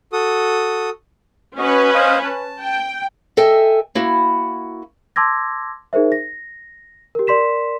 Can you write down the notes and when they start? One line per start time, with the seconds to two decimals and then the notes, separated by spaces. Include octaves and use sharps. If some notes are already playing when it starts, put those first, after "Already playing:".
0.13 F#4 A4 D#6
1.58 C#4 F#4 B4 D#5
1.94 C5 D#5 F5
2.24 A5
2.62 G5
3.37 A4 D#5 E5 G5 G#5
3.95 A#3 E4 F#4
5.16 A5 C6 D6 E6 G#6 A#6
5.93 D#4 G#4 A#4 C5 E5
6.12 A#6
7.15 G4 A#4
7.27 A#4 D5 C6 B6 E7